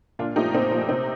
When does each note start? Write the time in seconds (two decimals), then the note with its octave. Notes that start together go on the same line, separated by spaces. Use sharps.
0.19 A#2 D4 F4
0.36 F3 A3 D#4 G4
0.53 A#2 C4 D#4
0.71 F3 A3
0.88 C3 C4 D#4